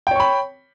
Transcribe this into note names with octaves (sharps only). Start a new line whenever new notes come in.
C#5 G5 B5 C#6